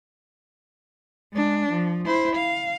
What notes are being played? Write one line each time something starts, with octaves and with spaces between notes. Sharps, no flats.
G#3 D4
F3
E4 C5
F5